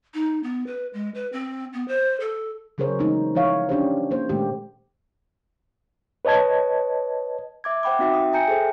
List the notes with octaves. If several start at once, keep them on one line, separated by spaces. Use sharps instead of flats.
D#4
B3
B4
G#3
B4
C4
B3
C5
A4
C#3 F#3 G#4 A#4 C5 C#5
E3 G#3 A3 C4 D#4
F3 E4 C#5 F5
C#4 D4 G4 C5
A#3 C5
A#2 D#3 G#3 A3 G4
B4 C#5 D#5 A5 G#6
E5 D6 G#6
C5 F#5 G5 B5 D6
C4 D#4 F#4 E5 G5
D#6
E5 G5 G#5 A#5 G6 C#7
G#4 A4 C5